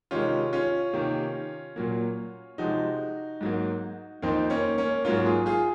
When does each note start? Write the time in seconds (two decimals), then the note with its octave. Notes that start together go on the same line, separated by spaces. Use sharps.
0.11 C3 D#3 G#3 C#4 F4
0.53 C#4 F4
0.93 C3 D#3 A#3
1.76 A#2 F#3 A#3
2.58 C3 F3 G#3 D#4 F#4
3.41 G#2 F#3 A#3
4.22 F2 D#3 A#3 C4 D#4
4.50 A#3 C#4
4.78 A#3 C#4
5.05 G#2 F#3 A#3 C#4 F4
5.26 F4 G#4
5.46 F4 G#4